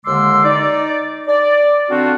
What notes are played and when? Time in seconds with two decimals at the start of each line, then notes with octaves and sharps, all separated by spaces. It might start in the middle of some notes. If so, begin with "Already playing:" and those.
0.05 D#2 D3 G#3 C6 D6 E6
0.44 D#4 D5
1.27 D5
1.89 D3 C4 D4 F4 F#4